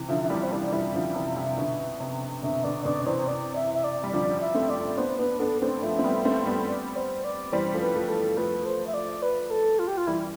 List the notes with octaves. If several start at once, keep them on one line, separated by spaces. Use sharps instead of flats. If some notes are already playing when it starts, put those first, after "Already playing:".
Already playing: C3 E3
D3 F3 E5
E5
E3 G3 D5
C5
E3 G3 D5
D5
E3 G3 E5
D3 F3
C3 E3
C3
B2 D3
C3
B2 D3 E5
B2 D3 D5
B2 D3 D5
C3 E3 C5
D5
E5
E5
D5
G3
D3 F3 D5
E5
A3 C4
D5
B3 D4 C5
B3 D4 B4
B3 D4 A4
A3 C4 C5
F3 A3 E5
C4
G3 B3
A3 C4
G3 B3
D5
C5
D5
E3 G3 C5
F3 A3
B4
F3 A3
A4
F3 A3 B4
C5
E5
D5
B4
A4
F4
G4
F4
E3 G3 E4